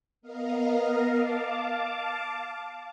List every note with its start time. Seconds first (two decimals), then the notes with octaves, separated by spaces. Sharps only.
0.21 B3 A#4 D#5 F5
1.10 F5 A5 D6